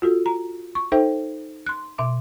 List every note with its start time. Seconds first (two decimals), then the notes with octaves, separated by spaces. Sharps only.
0.02 F4 F#4 A4
0.26 A#5
0.75 C#6
0.92 D#4 A4 C5 E5 G5
1.66 C6 F#6
1.98 B2 E5 D6